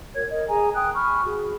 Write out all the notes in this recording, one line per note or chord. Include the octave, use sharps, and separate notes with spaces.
F#4 A#4 C#5 G#6
A#4 D#5
G#4 G#5 A#5
G5 D#6 F#6
G#5 B5 C#6 F6
F#4 G#4